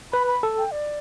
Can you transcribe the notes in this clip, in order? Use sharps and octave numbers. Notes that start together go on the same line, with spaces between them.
B4 B5
B5
A4
G5
D5